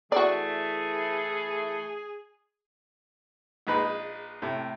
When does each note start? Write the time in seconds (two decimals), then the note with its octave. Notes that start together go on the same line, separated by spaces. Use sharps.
0.12 E3 A3 F#4 G#4 D5
3.67 A#1 G#3 D#4 B4 B5
4.42 A2 C3